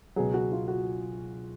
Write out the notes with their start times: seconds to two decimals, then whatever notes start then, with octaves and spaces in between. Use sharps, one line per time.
0.16 C#2 B2 F#3 G#4
0.34 F#4
0.52 F4
0.68 F#4